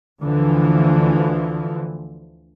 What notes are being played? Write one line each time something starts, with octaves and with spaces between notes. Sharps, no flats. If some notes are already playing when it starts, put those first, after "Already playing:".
D2 D3 E3 F3